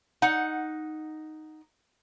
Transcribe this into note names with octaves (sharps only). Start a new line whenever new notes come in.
D#4 F#5